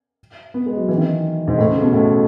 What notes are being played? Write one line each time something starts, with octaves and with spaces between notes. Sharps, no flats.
B3
G#3
F#3
E3
D#3
G#2
A2
C#3
B2
A2